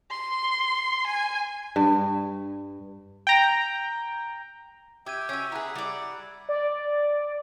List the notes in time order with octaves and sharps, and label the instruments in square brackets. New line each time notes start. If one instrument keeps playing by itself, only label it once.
[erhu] C6
G#5
[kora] G2
[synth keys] G5 A#5
[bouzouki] G4 [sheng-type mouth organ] E5 G5 [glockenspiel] D6 G#6 D#7
[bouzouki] C#4 F#4 [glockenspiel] E6 G#6
[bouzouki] B3 G#4 [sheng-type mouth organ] E4 E5 [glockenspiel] A#5 F#6
[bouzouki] G3 D5 [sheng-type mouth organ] F#5
[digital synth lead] D5